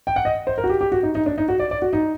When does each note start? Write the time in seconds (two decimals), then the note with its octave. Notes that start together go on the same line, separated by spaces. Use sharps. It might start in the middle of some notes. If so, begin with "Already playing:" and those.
0.07 G5
0.16 F#5
0.25 D#5
0.47 C5
0.58 A#4
0.64 F#4
0.70 G4
0.81 G4
0.92 F#4
1.03 D#4
1.15 D#4
1.26 D4
1.38 D#4
1.49 F#4
1.59 D5
1.71 D5
1.82 F#4
1.93 D#4